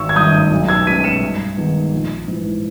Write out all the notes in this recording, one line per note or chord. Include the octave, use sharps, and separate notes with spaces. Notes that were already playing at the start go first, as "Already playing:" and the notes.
Already playing: G#1 C#6 E6
G#6
G2 D#3 D#6 G6
B1
E6 G#6
B2 G#3 C#4 B6 D#7
C#7 E7
G2
D#3 G#3 B3
A#1
G#2 E3